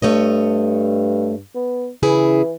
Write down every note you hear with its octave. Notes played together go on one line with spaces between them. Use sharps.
G2 A3 C#5 D#5
B3
C#3 E3 E4 G#4